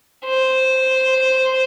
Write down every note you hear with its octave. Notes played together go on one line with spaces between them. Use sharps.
C5